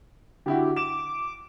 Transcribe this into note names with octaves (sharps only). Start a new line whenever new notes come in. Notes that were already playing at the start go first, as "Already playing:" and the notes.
D3 E4 F#4 G4
D6 E7